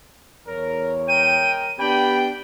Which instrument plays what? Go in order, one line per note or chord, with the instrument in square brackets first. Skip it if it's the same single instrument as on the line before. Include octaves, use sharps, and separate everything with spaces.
[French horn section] E2 C#5 [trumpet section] A#4
[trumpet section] G#3 A#4 G5 [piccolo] D#7
[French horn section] B3 G4 [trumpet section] D4 G5 [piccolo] B5